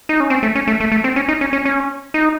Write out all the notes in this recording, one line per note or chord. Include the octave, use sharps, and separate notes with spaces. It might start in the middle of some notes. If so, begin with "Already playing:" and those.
D#4
C#4
C4
A3
C#4
A3
A3
A3
C4
C#4
D#4
C#4
C#4
C#4
D#4